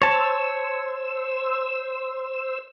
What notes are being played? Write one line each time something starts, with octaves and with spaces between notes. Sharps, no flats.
C5 C#5 A5 E6